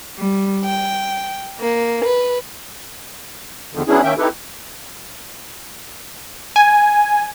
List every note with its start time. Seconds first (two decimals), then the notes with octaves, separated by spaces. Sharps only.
0.18 G3
0.64 G5
1.59 A#3
2.04 B4
3.73 E2 D3 D#3 F3
3.88 F#3 B3 C#4 D4 E4 G#4
4.03 D#3 A#3 C#4 E5 G5
4.18 C4 D#4 E4 G4 A4 B4
6.56 G#5